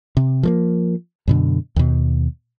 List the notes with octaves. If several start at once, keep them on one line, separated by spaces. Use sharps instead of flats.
C3
F3 A3 A#3
F#2 B2 D3
D#2 B2